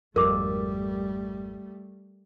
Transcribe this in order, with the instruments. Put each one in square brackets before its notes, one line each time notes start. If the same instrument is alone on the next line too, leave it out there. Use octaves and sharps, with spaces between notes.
[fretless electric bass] G#1 F2 [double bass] G3 A3 [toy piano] A#4 D6